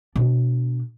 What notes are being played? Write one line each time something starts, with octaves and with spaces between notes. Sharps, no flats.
B2 D4